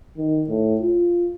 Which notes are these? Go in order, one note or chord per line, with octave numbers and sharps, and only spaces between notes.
D#3
A2
F4